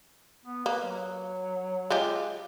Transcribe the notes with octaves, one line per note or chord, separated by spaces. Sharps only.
B3
A#3 B4
F#3
G#3 F4 G4